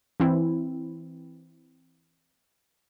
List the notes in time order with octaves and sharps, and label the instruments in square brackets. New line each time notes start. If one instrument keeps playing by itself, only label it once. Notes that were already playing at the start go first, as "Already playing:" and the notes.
[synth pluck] E3 C4 E4